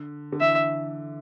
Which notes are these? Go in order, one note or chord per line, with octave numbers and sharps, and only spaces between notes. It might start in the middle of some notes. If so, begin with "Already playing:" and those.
Already playing: D3
D3
E3 E5